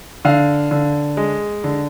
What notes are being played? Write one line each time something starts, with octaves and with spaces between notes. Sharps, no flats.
D3 F5
D3
G#3
D3